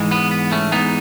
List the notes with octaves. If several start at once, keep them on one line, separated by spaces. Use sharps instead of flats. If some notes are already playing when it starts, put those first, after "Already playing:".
Already playing: G#2 E3 G#3
B3
B3
A3 C#4
G#2 E3 G#3 B3 D#4